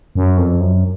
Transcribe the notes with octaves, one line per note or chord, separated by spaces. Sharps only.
F#2
F2
F#2